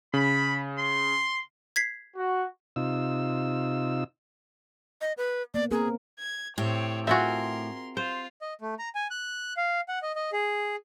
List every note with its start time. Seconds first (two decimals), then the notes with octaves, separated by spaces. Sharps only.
0.14 C#3 B5
0.78 C6
1.76 G#6 B6 C7
2.17 F#4
2.76 C3 D#4 F4 E6
5.01 D#5
5.18 B4
5.54 A#3 B3 D5
5.71 A#3 C4 G#4 A#4
6.19 G#6
6.58 A2 C4 G4 C#5
7.07 C4 F4 F#4 G#4 A#4 E5 C6
7.97 F4 C5
8.41 D#5
8.61 A3
8.79 A#5
8.95 G#5
9.11 F#6
9.57 F5
9.88 F#5
10.02 D#5
10.16 D#5
10.33 G#4